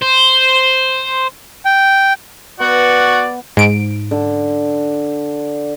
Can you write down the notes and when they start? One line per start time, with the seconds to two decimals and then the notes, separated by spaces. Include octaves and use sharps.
0.02 C5
1.65 G5
2.60 B3 F#4 D5 F#5
3.57 G#2 D7
4.11 D3